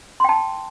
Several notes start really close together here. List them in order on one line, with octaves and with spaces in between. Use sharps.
C6 G5 A5